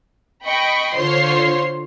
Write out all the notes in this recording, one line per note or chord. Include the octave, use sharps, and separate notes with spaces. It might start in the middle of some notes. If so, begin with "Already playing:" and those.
D#5 G5 B5 C#6
D3 F4 C5 C#5 C6 C7